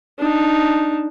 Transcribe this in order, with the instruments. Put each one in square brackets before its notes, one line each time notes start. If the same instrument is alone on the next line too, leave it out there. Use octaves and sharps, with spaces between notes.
[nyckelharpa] D4 D#4